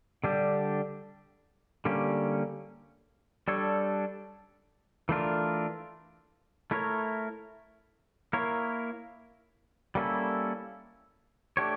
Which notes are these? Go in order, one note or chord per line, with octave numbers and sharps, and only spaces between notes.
D3 G3 D4 G4
D3 G3 A#3 C#4 G4
G3 D4 A4 C#5
E3 A3 D4 F4 A#4
A3 E4 A#4 C#5
A#3 E4 A#4 C#5
G3 A#3 C#4 E4 A4
A3 D4 G4 C#5